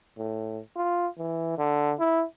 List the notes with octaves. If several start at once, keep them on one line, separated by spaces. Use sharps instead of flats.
A2
F4
E3
D3
E4